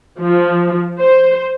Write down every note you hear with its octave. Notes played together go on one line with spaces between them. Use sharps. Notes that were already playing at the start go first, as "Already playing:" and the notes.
F3
C5